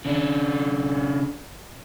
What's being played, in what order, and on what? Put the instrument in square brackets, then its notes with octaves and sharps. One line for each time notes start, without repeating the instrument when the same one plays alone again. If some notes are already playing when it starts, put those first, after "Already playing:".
[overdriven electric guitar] C#3 D4